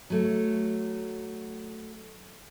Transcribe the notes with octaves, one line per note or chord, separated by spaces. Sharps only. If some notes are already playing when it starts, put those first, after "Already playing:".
F#3 A3